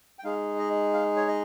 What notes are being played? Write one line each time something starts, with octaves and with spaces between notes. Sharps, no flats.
G5
G#3 D#4 G#4 F5
D#5
F5
C#5
D#5